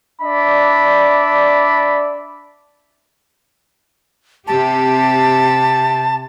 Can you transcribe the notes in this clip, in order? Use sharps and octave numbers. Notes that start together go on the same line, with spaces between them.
D4 D5 E5 B5
C3 G4 A5